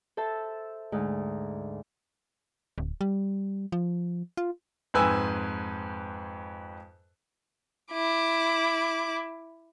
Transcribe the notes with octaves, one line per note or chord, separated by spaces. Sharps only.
A4 C5 E5 A5
D2 G#2 D#4
D1
G3
F3
F4
F2 G#2 B4 G#5 E6
E4 D6